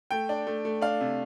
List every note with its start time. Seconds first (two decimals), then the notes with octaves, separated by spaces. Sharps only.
0.11 A3 G5
0.29 D4
0.47 A3
0.65 A3
0.82 D4 F5
1.01 C3